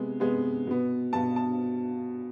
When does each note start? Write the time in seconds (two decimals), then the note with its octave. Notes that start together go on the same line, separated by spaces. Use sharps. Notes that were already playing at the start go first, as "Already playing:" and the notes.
Already playing: C3 G#3 B3
0.20 C3 G#3 B3
0.67 B2 B3
1.13 B2 B3 A5
1.36 A5